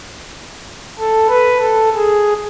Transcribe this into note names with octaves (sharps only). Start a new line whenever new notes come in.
A4
B4
A4
G#4